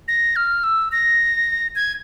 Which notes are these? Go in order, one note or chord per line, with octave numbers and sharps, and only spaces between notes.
A#6
F6
E6
A#6
G#6